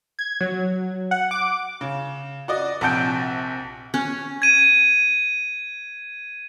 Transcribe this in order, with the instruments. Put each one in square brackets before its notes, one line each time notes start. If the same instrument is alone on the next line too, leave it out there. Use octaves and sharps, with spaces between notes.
[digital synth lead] G#6
F#3
F#5
D6
[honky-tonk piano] C#3
F#4 D5 D#5
A#1 C3 F#5 A5 G6 D7
[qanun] C#4
[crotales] G#6 D#7